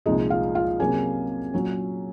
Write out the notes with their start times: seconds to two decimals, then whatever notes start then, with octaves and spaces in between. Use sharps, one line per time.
0.06 C2 A#2 F3 G#3 D#4 D#5
0.30 F4 F5
0.55 F4 F5
0.79 C3 F#3 A#3 C#4 G#4 G#5
1.54 A#2 F#3 C#4